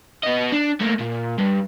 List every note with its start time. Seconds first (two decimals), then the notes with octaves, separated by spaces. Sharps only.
0.23 B3 D#5
0.52 D4
0.80 A3 A#3
0.99 A#2
1.38 G2